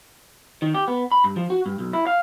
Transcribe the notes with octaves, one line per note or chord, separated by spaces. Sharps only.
D#3
G4
B3
B5
G2
F3
F#4
G2
B1
E4
F5